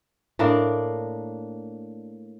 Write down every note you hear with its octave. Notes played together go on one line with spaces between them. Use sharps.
A2 A#3 D4